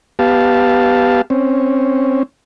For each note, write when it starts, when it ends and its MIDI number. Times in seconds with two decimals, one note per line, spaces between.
0.19 1.21 59
0.19 1.21 67
0.19 1.21 77
0.19 1.21 81
1.30 2.23 60
1.30 2.23 61